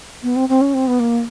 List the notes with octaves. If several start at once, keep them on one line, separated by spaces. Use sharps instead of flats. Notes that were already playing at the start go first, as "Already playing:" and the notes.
B3
C4
C4
C#4
C4
B3
A#3